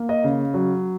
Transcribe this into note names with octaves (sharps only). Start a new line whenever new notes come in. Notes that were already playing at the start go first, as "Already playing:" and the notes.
Already playing: A#3
D#5
C#3
F#3